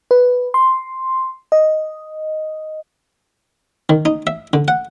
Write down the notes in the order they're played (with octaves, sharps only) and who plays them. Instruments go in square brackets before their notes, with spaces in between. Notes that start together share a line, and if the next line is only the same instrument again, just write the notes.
[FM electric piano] B4
C6
D#5
[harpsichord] D#3
D#4
E5
D3
F#5